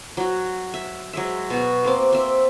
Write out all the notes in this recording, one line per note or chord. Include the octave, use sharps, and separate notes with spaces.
F#3 F#4
E5
F#3 G#3 E5
B2 F#4
A#3 C4 D6
C4 E5